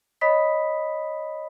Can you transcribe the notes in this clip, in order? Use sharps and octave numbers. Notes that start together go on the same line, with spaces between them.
C#5 D#5 B5 D#6 B6